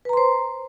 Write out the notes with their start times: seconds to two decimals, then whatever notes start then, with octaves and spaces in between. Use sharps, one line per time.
0.05 B4
0.09 A#5
0.13 C6
0.17 C5